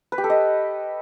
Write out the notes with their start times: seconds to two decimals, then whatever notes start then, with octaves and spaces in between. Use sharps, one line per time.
0.12 B4
0.18 G4
0.24 A4
0.30 D#5